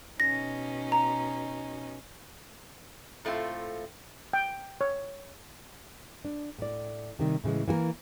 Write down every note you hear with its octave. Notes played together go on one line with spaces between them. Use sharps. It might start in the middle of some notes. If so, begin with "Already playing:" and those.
B2 C#4 D#4 A#6
A#5
A2 A3 C4 F4
G5
C#5
D4
A2 D5
C3 D#3 G3
A2 C#3 E3 G#3
E3 A#3 F#4 A#4